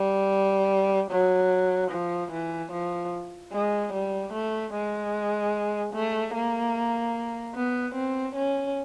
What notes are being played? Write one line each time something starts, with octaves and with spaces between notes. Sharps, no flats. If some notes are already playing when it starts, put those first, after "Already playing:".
Already playing: G3
F#3
F3
E3
F3
G#3
G3
A3
G#3
A3
A#3
B3
C4
C#4